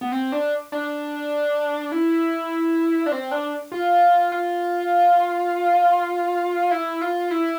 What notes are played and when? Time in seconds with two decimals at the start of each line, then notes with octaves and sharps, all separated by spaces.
0.01 B3
0.12 C4
0.32 D4
0.72 D4
1.92 E4
3.06 D4
3.12 C4
3.31 D4
3.72 F4
4.32 F4
6.71 E4
7.01 F4
7.31 E4